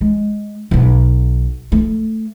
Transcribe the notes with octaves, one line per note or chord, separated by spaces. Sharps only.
G#3
B1 B3
A3